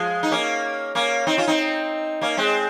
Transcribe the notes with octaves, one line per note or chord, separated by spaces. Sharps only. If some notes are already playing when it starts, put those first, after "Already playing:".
Already playing: F3 G#3
D#4
A#3 C#4
A#3 C#4
C4 D#4
C#4 F4
C4 D#4
A#3 C#4
G#3 C4